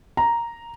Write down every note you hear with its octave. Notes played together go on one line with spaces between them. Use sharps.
A#5